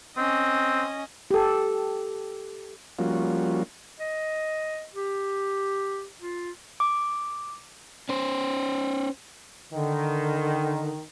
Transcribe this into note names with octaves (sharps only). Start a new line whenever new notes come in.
C4 C#4 D#5
G4 A4
F3 G3 A#3 C#4 F4 F#4
D#5
G4
F4
D6
C#4 C5
D3 D#3